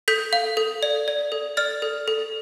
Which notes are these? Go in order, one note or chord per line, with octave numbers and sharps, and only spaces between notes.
A4 G6 B6
F5
A4
D5
D5
A4
D5 F6 A6
A4
A4